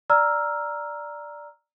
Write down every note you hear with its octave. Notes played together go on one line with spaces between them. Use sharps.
D5 A#5 E6 F6